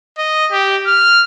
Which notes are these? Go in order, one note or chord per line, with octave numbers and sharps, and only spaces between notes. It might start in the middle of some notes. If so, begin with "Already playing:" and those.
D#5
G4
F6